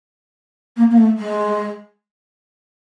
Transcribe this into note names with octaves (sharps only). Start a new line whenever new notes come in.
A#3
A#3
A3
G#3